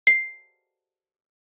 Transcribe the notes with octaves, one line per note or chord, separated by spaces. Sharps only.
C7